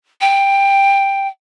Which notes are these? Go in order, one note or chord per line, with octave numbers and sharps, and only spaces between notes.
G5